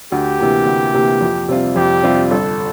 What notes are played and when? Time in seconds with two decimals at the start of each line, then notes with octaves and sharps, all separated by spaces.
0.12 D2 G4
0.39 C3 E3 A#3
0.66 D2
0.94 C3 E3 A#3
1.21 F2
1.49 C3 G3 C4 F4
1.76 F2 G4
2.03 C3 G3 C4 F4
2.30 G1 A4